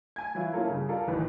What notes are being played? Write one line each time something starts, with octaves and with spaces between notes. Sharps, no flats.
G#5 G#6
E3 F#3 E4 F4
A#3 C#4 E4 F4 A4 A#4
G2 C#3
F4 A4 A#4 D5 F5
A1 D#3 E3 F#3 B4